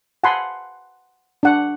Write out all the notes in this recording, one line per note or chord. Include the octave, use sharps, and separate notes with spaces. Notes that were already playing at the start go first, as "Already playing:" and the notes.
F#5 G#5 A5 B5 C6
D4 F#5